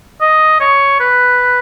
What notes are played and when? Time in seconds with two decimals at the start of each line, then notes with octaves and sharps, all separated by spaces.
0.21 D#5
0.60 C#5
1.00 B4